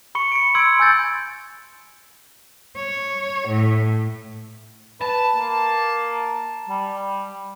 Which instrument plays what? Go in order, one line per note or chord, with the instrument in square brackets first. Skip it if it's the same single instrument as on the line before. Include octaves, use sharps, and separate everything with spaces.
[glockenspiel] B5 C#6 C#7
C#7 D7
C6 E6 G#6 C#7 D7
G#5 E6 G6 A6
[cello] C#5
A2
[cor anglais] B4 [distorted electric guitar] A5
[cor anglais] A#3
G3